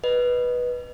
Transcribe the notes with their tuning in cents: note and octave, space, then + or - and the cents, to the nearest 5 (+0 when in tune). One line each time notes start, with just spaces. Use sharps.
B4 -10 D#5 -15